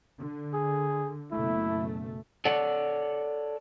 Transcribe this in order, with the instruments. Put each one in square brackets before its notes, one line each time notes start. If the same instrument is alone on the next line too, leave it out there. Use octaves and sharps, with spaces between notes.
[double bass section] D3
[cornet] G#4
[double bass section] F#1 B2 A3 [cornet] E4
[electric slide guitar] A4 C#5 D5 F#5